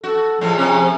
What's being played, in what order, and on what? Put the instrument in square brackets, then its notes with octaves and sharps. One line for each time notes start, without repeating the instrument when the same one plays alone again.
[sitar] F#4 [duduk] A4
[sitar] A2 G#3 [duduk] F3
[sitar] C3 C#4